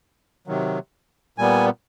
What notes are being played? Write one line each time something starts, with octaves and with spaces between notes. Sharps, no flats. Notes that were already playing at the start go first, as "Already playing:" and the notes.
C3 D#3 F#3
A#2 G3 B3 G#5